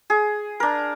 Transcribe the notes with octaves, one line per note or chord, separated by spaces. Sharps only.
G#4
D4 A#4